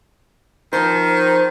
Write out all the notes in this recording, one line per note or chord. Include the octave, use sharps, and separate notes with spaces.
D#3 F3 C4 C5